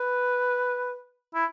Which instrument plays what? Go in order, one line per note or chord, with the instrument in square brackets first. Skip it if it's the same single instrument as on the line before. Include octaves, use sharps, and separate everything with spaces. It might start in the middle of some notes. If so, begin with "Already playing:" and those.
Already playing: [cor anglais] B4
E4